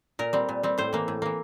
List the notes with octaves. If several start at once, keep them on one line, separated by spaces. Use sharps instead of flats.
A#2 A#4
G3 C4
A#2
G3 C4
A2 C5
E3 A#3
A2
E3 A#3